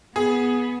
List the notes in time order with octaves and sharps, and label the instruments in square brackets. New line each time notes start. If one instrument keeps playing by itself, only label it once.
[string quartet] B3 [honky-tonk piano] G#4